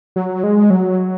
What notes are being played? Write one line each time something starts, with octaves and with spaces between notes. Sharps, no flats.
F#3
G#3
F#3